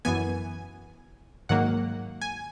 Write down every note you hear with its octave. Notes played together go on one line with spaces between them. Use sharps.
F#2 E3 B3 G#5
G#2 D#3 F#3 A#3 F#5
G#5